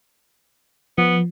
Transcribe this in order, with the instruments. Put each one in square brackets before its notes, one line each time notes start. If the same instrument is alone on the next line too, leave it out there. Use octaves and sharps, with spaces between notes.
[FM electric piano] F3 [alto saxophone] B3